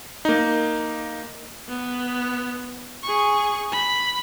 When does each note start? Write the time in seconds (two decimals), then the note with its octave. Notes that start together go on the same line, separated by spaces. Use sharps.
0.25 A#3 D#4
1.68 B3
3.03 G#4 C#6
3.72 B5